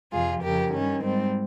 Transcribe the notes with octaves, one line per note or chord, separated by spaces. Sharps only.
F2 C3 F3 F4 G#4
F2 C#3 F3 G4 A#4
G2 D#3 G3 C#4
G#2 G3 C4